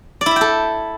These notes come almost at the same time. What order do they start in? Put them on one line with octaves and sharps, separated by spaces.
D5 E4 E5 G5 A4